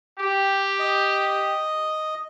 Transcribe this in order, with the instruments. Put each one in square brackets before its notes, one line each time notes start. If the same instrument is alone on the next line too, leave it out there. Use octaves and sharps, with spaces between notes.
[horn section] G4
[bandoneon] D#5